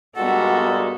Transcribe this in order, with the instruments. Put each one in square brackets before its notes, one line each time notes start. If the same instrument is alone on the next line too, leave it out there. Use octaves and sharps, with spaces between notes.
[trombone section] G2 A#2 G#3 [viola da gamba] B3 F#4 [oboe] A4 [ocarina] F#5